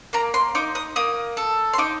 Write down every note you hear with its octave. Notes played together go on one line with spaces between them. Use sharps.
A#3 A#5
C6
D#4 D6
D#6
A#3 D#6
A4
C6
D#4 D6